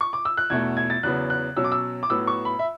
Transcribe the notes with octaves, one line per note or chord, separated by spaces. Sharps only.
C#6
D6
E6
F#6
E2 B2 A3 G#6
G#6
A6
E2 C#3 F#3 B3 F#6
F#6
B2 F#3 C#4 E6
D6
E6
D6
A2 F#3 B3 E6
C#6
B5
E5